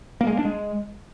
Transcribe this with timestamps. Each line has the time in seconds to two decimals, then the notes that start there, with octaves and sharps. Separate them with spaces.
0.21 A#3
0.27 G#3
0.33 A#3
0.39 D4
0.45 G#3